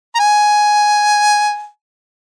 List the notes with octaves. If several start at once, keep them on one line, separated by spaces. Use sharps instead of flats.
A#5
G#5